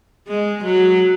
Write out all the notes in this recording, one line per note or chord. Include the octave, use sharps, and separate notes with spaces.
G#3
F#3